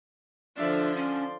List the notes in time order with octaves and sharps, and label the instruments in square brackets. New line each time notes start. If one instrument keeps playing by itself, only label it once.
[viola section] D3 F3 [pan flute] D4 [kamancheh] D5 E5
[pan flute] C#4 [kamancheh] D5 C6